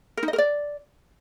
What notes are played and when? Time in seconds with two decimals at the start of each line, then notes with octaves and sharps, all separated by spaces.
0.17 A#4
0.23 D#4
0.28 D#5
0.33 A#4
0.38 D5